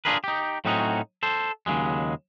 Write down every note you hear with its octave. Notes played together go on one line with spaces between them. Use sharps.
D4 F4 G#4 A#4 B4
D#4 G4
A2 F#3 C4 C#4 D#4 F#4
A4 C5
D#2 C#3 F#3 G#3